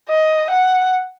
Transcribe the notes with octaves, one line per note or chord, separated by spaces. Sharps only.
D#5
F#5